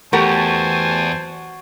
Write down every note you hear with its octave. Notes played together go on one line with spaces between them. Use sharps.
E2 A3 F#4 G4 A#4 C5 G#5 A5